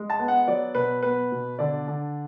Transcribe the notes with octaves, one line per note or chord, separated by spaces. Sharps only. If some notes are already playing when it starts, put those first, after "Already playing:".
Already playing: G#3
A5
B3
F#5
F#3 D5
B2 B4
B3 B4
B2
D3 D5
D3